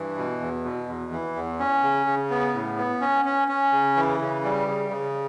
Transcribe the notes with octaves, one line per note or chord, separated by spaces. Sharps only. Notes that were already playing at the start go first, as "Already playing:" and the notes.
Already playing: G2 E3
B2
E2
B2
E2
E3
E2
C#4
C#3
C#3
B3
A2
B3
C#4
C#4
C#4
C#3
E3
C#3
G3
C#3
C#3